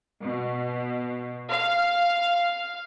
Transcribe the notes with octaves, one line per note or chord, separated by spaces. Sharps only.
B2
F5